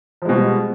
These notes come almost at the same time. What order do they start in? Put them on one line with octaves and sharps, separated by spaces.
F3 G#3 B2 G3